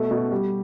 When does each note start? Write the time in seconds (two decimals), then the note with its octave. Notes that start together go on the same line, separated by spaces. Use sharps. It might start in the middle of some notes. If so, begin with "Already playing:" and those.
Already playing: B2 A3
0.11 B2
0.32 G3